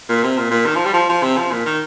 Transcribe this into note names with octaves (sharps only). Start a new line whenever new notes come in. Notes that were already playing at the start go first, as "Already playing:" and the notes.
A#2
C3
A#2
A#2
D#3
F3
G3
F3
F3
C3
F3
A#2
D#3